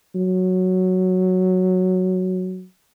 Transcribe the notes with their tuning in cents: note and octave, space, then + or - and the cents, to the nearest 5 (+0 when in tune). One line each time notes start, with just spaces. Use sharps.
F#3 +0